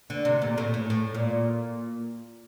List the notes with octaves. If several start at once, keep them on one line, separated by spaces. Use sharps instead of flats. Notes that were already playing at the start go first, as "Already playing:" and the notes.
D3
C3
A#2
A2
A2
A2
A#2